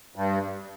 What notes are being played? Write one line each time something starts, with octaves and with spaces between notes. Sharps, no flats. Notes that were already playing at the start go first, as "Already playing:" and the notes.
G2